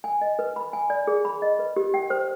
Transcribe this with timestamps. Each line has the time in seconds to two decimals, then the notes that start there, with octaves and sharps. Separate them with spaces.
0.04 G#5
0.21 D#5
0.39 B4
0.56 B5
0.73 G#5
0.90 D5
1.07 G#4
1.25 B5
1.42 D#5
1.59 B4
1.76 G4
1.94 G5
2.10 C5